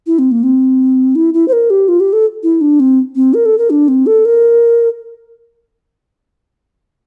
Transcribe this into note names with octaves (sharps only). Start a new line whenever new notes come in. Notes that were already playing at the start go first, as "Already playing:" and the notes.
E4
C4
A#3
C4
E4
E4
C5
A#4
G4
F4
G4
A4
E4
D4
C4
C4
A#4
A4
A#4
D4
C4
A4
A#4